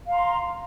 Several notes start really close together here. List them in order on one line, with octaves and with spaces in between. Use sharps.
F5 A#5 C6